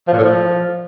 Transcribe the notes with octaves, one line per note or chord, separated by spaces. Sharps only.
F3
A#2
A2
F3